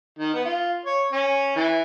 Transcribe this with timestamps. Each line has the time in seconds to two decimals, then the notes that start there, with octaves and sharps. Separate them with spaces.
0.19 D#3
0.34 B3
0.45 F4
0.86 C#5
1.12 C#4
1.56 E3